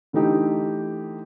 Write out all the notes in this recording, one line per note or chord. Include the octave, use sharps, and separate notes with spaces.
D3 E3 A3 D#4 G4